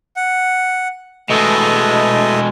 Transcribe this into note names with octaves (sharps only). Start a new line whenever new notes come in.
F#5
B2 G#3 A3 D#5